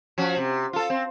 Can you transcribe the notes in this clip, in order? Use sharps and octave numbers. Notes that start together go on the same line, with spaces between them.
F3 C#4 F#4
C3
F4 A4
C4